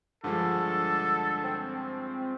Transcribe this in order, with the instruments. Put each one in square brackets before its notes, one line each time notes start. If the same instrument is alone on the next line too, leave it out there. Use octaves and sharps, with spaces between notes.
[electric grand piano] G2 F3 G#3 [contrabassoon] D3 [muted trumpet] A4
[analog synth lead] C4